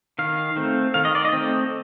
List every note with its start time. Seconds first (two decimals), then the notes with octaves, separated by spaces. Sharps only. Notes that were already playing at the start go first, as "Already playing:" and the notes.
0.19 D#3 F5
0.56 A3 C4
0.94 D#3 F5
1.05 D#5
1.15 D5
1.25 D#5
1.33 A3 C4